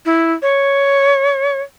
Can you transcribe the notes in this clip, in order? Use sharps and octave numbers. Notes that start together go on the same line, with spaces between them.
E4
C#5